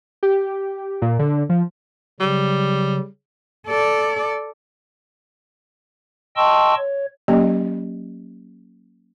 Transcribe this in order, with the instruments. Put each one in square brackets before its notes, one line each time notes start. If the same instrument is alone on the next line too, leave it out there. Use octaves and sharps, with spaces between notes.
[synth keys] G4
A#2
D3
F3
[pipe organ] C#3 F#3 [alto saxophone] G3
[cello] A4 D5
[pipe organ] D#5 G5 A5 C6 C#6 E6
C#5
[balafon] F#3 A#3 C#4 G4 D5 D#5